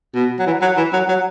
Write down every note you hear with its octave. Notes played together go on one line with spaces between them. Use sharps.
B2
F#3
E3
F#3
E3
F#3
F#3